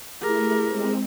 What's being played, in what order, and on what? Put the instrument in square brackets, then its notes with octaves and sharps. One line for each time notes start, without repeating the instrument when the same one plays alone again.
[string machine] A3 [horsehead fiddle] E4 A#4 [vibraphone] G4 G#4 D6
[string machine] G#3 C4